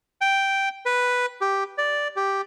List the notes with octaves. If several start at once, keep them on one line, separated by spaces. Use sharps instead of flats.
G5
B4
G4
D5
G4